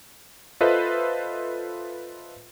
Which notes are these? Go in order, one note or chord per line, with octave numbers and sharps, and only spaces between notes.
F4 A4 B4 C5 D#5 E5